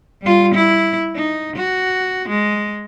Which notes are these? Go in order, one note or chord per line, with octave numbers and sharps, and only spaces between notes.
G3 F4
E4
D#4
F#4
G#3